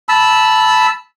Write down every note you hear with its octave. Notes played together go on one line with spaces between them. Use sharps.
A5 B5 E6